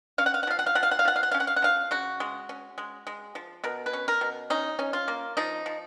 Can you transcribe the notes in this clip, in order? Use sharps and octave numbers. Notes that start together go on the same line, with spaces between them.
C#4 F5
F#5
F5
F#5
F3 F5
F#5
F5
F3 F#5
F5
F#5
F5
F3 F#5
F5
F#5
C#4 F5
F#5
F5
F#5
F3 F5
C#3 F#4
G#3
C#4
G#3
G#3
F3
B2 A#4
B4
C#4
A#4
B2
C#4 D#4
C#4
F4
A#3
F3 D#4
F3